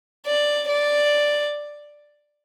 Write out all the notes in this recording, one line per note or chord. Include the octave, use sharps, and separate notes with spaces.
D5
D5